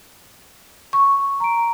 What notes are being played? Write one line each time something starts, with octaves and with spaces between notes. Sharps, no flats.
C#6
A#5 D7